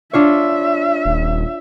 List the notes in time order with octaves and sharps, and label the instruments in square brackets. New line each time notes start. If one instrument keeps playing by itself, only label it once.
[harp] D4 F4 C#5 [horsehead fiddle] E5
[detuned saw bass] D#1